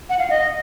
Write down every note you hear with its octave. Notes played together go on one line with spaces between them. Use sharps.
F#5
F5
D#5